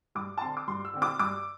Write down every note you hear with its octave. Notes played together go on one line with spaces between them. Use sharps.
G2 D6
A5
D3 C4 C6
D6
G2 C6
E6
D3 C4
D6
G2 D6